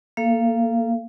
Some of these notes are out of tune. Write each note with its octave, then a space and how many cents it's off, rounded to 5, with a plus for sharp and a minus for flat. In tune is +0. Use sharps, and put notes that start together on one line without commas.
A#3 +0 A4 +0 F5 -25